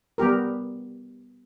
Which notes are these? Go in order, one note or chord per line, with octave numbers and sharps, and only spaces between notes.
G3 B3 G4 A#4